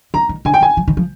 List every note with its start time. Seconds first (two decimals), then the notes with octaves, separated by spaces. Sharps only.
0.14 D#3 A#5
0.29 D#3
0.45 D3 G#5
0.54 G5
0.61 D#3 G#5
0.77 F3
0.88 D#3
0.97 F3